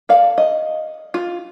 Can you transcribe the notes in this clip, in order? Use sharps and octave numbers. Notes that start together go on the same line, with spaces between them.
A4 D5 F5
D#5
F4